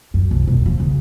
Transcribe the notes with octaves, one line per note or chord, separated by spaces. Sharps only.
F#2
C2
E2 B2
F3
C#3